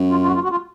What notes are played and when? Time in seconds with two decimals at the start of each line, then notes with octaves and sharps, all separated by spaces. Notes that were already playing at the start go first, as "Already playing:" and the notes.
Already playing: F#2
0.11 F4
0.22 F4
0.27 F#4
0.35 F4
0.43 F#4
0.51 F4